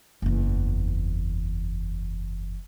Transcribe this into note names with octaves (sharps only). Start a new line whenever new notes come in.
F#1 E2